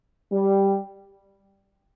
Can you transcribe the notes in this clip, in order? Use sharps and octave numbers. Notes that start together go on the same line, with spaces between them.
G3